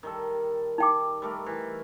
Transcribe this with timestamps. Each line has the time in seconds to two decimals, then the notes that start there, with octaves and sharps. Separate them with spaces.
0.03 D#3 G3 A4
0.78 D#4 G5 D6
1.22 G3 A3 A#4
1.46 E3